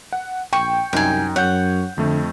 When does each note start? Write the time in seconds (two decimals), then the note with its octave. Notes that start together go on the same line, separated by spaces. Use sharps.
0.13 F#5
0.53 A#1 G5 C#6
0.93 C2 F#2 D#4 G5 G#5
1.36 F#2 C#5 F#5 G6
1.98 F2 D3 A3